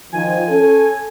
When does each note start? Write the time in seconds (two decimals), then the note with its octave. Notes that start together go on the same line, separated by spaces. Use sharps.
0.13 D#3 F3 G#5
0.49 C#4 A4